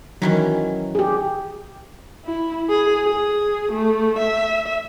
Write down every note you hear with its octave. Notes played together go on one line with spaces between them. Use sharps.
D#3 E3 F#3 C#4
G4 G#4
E4
G#4
G#4
A3
E5